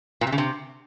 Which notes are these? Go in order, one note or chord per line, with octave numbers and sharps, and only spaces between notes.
A#2
C3
C#3
C3